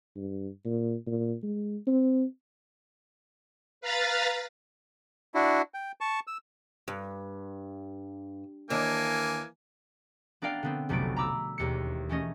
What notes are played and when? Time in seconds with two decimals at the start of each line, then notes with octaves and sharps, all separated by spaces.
0.16 G2
0.65 A#2
1.06 A#2
1.43 G#3
1.87 C4
3.81 B4 F5 A#5 B5 A6
5.35 D4 E4 F#4
5.74 G5
6.01 A5 C#6
6.27 E6
6.88 G2
8.70 D#2 E3 A#3 D4 G#5
10.42 B3 D4 A#4 D5 F5 G5
10.63 D3 B3 C4
10.89 F1 B1 A3 B3 A6 D7
11.16 A#5 B5 D6 E6
11.58 E1 D#2 C#7
12.09 E3 A3 C#4 D#5